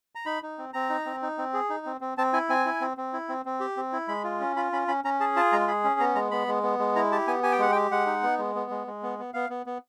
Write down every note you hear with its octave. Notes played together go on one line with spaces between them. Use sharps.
A#5
D#4 B5
D#4
C4
C4 A#5
D#4
C4
D#4
C4
G#4
D#4
C4
C4
C4 A5
E4 G#5
C4 G#5
E4
C4
C4
E4
C4
C4
G4
C4
E4
G#3 B5
F4
C#4
F4 B5
C#4 B5
C#4 B5
C#4 A#5
G#4 A5
F4 A5
G#3 A#5
G#4 B5
C#4
B3 A#5
G#3 A#5
B3 B5
G#3
B3
G#3
E4 A#5
G4 A5
B3 G#5
G4 G#5
G5
G#3 F#5
G5
G4
G#3 F#5
D#4
B3
G#3
B3
G#3
G#3
B3
B3
B3 F5
B3
B3